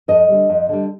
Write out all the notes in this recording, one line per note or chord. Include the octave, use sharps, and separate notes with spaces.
F2 D#5
D3 G3
F2
D3 G3